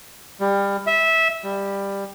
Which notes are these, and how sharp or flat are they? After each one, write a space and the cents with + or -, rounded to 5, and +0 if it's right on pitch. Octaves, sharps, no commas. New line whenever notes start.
G3 +25
E5 -15
G3 +15